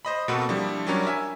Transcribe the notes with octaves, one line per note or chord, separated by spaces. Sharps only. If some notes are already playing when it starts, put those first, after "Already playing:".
C5 D#5 B5
B2 A#3 C4 F#4 A4 B4
F3 G3 D4 E4
F#3 G3 C#4 D4 A#4 C#5
E5 G#5